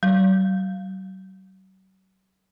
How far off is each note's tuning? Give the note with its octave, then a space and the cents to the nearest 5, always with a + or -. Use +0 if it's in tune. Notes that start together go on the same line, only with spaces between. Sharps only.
F#3 +40